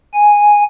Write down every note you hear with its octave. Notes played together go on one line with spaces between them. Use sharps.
G#5